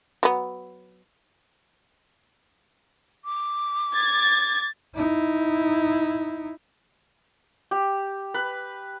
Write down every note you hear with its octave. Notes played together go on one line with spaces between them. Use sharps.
F#3 B3
D6
G#6 A6
D#4 E4
G4
B4